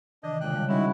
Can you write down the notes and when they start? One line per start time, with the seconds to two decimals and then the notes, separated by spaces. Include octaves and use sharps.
0.23 C3 D#3 E3 D4 D#5
0.41 A#2 C#3 G#3 G5 F#6
0.56 G3 C#5 F5
0.69 G#3 C#4 D#4 E4 F#4